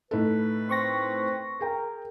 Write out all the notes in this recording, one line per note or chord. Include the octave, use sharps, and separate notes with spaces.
A2 D#4 A4 B4
C4 C6 C#6 A#6
G#4 A#4 G5